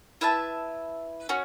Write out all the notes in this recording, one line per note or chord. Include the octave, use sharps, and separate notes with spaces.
E4 B4 E5 A5
C#4 F#4